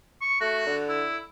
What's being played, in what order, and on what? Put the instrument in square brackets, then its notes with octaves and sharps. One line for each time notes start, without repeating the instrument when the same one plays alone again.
[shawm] C#6
[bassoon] A3 [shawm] F#4
[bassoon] D3
[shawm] E4